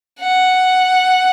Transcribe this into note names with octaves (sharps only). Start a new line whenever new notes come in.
F#5